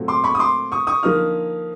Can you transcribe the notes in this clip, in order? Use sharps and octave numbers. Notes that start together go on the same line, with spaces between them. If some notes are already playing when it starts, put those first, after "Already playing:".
Already playing: A#2 F#3 A3 C4
C6 D6
B5 C#6
D#6
C6 D6
C#6 D#6
C#6 D#6
D3 F3 A#3 D#4 D#6 F6